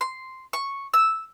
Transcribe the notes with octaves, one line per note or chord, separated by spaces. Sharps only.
C6
C#6
E6